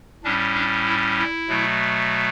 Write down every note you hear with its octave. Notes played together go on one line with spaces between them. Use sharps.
A2 G3 C#4 D4
D4
E4
E4
B2 F#3 A3